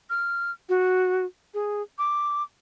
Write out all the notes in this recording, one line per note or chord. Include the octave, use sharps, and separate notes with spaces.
F6
F#4
G#4
D6